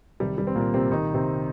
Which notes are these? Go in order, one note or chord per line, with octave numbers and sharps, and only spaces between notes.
C2 C3 D#3 G3
G3
C4
A#2 A#3
C3 C4
C2 C3 D#3 D#4
C3 C4